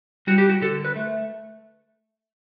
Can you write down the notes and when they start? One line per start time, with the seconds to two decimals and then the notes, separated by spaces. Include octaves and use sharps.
0.27 G3 F#4
0.38 G4
0.50 F#4
0.61 D3 A4
0.85 B4
0.96 A3